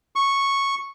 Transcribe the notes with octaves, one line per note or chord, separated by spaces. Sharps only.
C#6